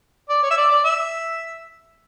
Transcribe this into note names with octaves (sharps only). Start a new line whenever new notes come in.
D5
C#5
E5
D5
D5
E5